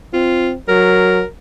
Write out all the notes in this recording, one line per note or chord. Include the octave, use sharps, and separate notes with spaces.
C4 F4
F#3 A#4